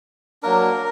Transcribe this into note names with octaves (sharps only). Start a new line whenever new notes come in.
F#3 A#3 D4 A#4